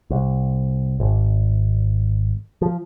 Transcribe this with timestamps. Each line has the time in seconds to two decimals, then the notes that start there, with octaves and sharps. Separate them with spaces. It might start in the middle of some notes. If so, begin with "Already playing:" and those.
0.10 C2
1.00 G#1
2.62 F3